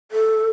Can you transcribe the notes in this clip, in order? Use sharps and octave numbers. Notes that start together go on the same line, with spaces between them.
A4